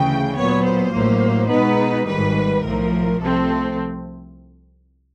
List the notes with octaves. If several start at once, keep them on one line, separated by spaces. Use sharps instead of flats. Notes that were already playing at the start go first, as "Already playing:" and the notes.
Already playing: D2 C#3 E3 A3 G5
A#2 F#3 B3 C#5
C5
A1 A2 F#3 A#3
B2 G#3 B3 D#4 B4
G#1 G#2 D#3 G3 B4
B1 A2 F3 A#4
C2 C3 F3 A3 C4 A4